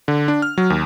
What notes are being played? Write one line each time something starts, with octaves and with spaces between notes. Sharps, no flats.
D3
D4
F6
F#3
D#2